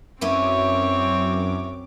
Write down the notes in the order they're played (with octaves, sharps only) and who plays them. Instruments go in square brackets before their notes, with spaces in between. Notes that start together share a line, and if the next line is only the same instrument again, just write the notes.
[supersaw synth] F#2 D6 [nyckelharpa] C4 C#5 [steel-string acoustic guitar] C#4 E4 B4